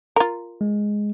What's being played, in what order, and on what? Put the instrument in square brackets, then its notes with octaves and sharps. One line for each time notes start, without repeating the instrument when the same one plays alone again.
[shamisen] F4 A#4
[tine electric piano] G#3